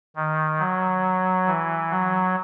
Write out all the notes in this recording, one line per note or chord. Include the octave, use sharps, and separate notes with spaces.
D#3
F#3
E3
F#3